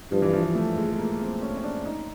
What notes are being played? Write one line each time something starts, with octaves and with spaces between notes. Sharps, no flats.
G2 F3
E3
F3
A3
G#3
A3
G#3
A#3
C4
C#4
C#4
D4
D#4